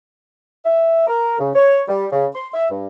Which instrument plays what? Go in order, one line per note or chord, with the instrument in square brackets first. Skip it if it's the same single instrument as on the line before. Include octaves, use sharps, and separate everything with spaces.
[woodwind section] E5
A#4
C#3
C#5
G3
C#3
C6
E5
G2